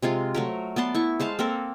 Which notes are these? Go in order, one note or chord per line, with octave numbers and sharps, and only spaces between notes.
C3 G#3 F4 C6
F#3 A3 A#4
B3 D5 A5 C6
E4 C#6
G#3 C5 F5 A5
A#3 C4 A4 A#4